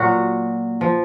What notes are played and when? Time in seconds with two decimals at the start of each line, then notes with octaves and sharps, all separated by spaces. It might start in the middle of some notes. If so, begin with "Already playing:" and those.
Already playing: A#2 F#3 F#4
0.81 F3